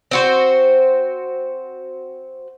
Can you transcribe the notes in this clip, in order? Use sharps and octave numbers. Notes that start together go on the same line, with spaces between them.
C4 F#4 C5